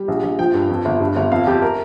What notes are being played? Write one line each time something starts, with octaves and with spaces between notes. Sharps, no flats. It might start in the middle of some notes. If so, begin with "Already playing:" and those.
Already playing: G3
A#1
A#1
F3 G5
G2
F2
G1
G2
G1
F2 F5
F2 G4
A#4